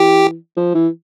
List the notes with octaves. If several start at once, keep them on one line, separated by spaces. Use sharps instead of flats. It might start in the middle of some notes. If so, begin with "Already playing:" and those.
Already playing: E3 G4
F3
E3